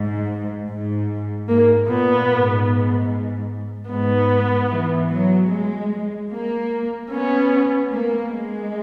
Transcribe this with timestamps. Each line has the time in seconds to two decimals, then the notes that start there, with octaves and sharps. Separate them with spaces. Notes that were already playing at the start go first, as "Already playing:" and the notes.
Already playing: G#2
0.68 G#2
1.48 G#2 A#3
1.88 A#2 B3
2.28 G#2
3.89 G#2 B3
4.69 E3
5.10 F#3
5.50 G#3
6.31 A#3
7.11 B3 C#4
7.91 A#3
8.31 G#3